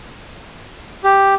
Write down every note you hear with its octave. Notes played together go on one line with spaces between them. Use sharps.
G4